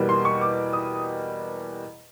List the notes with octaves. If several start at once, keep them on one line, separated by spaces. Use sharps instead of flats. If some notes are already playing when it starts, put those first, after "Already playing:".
Already playing: E2 B2 G3 A#3
C6
C#6
D6
D#6